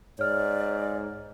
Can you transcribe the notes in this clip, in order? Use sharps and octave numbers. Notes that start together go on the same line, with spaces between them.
G#2 C#5 D5 F6